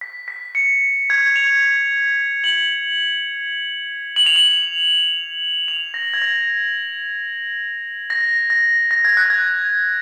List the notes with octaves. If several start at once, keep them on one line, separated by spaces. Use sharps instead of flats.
B6
B6
C#7
G#6
F7
F#7
F#7
F7
F#7
F7
A#6
G#6
A#6
A#6
A#6
A#6
G#6
F#6
G#6